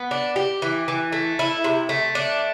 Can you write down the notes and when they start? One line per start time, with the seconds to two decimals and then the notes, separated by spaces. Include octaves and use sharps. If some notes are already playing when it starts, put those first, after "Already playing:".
Already playing: B3
0.11 D4
0.36 G4
0.62 E3
0.88 E3
1.13 A3
1.39 E4
1.64 C3
1.89 A3
2.15 D4